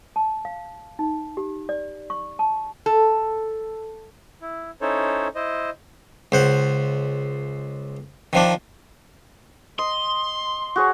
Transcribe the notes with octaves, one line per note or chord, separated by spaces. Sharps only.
A5
F5
D#4
G4
D5
C#6
A5
A4
E4
C#4 D#4 E4 A4 C5 C#5
E4 C5 D#5
C#2 C5 F#5
D#3 F3 D4
D#5 C6
F#4 G#4 C#5